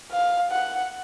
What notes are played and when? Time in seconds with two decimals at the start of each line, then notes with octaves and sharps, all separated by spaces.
0.12 F5
0.52 F#5